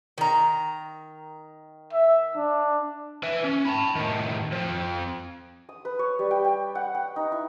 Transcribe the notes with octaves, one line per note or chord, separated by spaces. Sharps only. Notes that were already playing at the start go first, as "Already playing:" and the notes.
D#3 A#5
E5
D4
B4 E5
C#4
A5 B5
A2 D#3
F3 C4
D#6
B4
C#5
G3
G5
G5
F#5
G5
D#4
E4